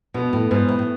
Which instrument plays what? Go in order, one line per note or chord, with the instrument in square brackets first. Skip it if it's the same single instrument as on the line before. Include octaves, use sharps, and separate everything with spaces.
[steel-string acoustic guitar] B2 [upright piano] B3
[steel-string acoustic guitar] A2
[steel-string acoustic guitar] G#2 [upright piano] B3
[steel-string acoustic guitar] A2
A2